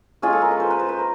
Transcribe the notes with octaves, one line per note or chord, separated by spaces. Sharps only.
G#3 C#4 F4 G#4
A4
A#4
B4
C5
B4
C5
B4
A#4